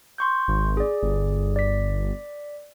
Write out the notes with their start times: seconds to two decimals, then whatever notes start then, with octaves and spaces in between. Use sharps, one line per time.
0.18 C6 C#6 G6
0.48 G#1
0.77 G#4 D5
1.03 G1
1.56 D5 B6